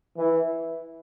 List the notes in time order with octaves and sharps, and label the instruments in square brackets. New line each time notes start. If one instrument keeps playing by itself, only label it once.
[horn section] E3